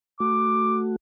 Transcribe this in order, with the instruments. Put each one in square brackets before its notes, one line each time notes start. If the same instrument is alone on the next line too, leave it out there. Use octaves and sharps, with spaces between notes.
[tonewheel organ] A3 F#4 [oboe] D6